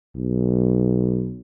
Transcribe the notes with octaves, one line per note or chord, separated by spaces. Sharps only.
B1